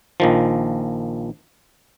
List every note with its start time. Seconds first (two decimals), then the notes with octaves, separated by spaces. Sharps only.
0.20 A#1 D#3 F3